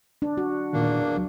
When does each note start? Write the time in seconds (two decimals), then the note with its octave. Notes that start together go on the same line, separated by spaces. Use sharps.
0.22 D4
0.37 F#4
0.73 E2 A#2 D#3 A#3 D4
1.15 C#2 F#3